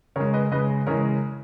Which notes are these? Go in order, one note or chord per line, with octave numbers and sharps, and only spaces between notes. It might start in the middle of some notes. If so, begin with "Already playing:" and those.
C#3 G#3 A#4 C#5
B4 D#5
C#3 G#3 B4 D#5
C#3 E3 G#3 A#4 C#5